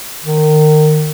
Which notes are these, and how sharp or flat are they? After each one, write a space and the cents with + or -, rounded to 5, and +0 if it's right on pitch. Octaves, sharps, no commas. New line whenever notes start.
D#3 -30